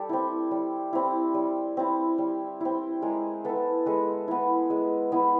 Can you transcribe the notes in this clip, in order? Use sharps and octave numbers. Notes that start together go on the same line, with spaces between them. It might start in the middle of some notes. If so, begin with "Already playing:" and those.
Already playing: G3 G4 A4
C4 E4
G3
C4 E4
G3
C4 E4
G3
C4 E4
G#3 G#4 A#4
B3 E4 A4 B4
G#3 A4 B4
B3 E4
G#3
B3 E4